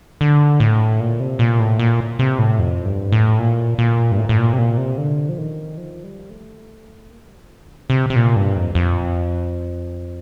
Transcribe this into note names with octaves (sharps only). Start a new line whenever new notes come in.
D3
A2
A#2
C3
A#2
A2
A#2
C3
A2
F2
G2
A2
A#2
A#2
G2
A2
A2
A#2
C3
A#2
C3
D3
F3
D#3
F3
G3
A3
A#3
A3
G3
F3
D3
C3
C3
A#2
G2
F2
F2